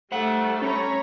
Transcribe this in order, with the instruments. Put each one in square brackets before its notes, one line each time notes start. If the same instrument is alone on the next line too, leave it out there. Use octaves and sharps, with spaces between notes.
[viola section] G3 A3 [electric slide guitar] C5 F#5
[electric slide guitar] C#4 [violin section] C#5 A#5 B5